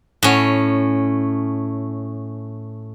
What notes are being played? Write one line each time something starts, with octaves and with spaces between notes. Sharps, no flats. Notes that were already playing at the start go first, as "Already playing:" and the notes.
A2 C#4